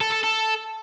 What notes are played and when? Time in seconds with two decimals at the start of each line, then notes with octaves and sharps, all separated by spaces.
0.01 A4
0.12 A4
0.24 A4